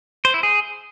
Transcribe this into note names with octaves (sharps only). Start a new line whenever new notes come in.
C5
E4
G#4